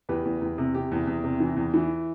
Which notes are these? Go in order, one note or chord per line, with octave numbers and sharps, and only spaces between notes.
E2 G4 B4
E2
E2
C3
C3 G4
E2
E2
C3
E3
E2
E3